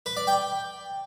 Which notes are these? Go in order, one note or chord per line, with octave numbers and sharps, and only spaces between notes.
B4
D5
G5